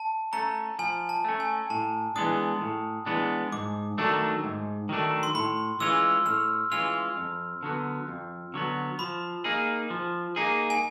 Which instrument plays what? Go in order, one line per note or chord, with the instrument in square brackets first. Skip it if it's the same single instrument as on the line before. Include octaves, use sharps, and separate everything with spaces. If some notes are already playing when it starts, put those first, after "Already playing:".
Already playing: [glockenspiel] A5
[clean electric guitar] A3 C#4 [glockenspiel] A#5
[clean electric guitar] F3 [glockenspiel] G#5
[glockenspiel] A5
[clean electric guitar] A3 C#4
[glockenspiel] G#5
[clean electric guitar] A2 [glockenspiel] A5
[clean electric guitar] E3 G#3 B3 D4 [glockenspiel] D#6
[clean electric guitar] A2
E3 G#3 B3 D4
[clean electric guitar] G#2 [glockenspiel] D6
[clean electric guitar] D#3 F#3 A3 D4
G#2
D#3 F#3 A3 D4
[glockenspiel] C6
[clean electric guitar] A2 [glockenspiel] B5
[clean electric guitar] E3 G#3 C#4 F4 [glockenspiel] E6
[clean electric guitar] A2 [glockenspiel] F6
[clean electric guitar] E3 G#3 C#4 F4 [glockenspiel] F6
[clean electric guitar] F2
D3 F#3 B3
F2
D3 F#3 B3
[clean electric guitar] F3 [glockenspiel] B5
[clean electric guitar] A#3 D#4 G#4
F3
A#3 D#4 G#4
[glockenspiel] G#5